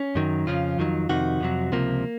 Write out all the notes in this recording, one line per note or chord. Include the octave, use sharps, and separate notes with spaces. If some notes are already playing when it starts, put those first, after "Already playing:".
Already playing: C#4
F#2 D#3 F#3
F2 C#3 F3 F4
F2 D#3 F#3
F2 C3 D#3 F#4
F2 C3 F#3
C#2 C3 F3 A#3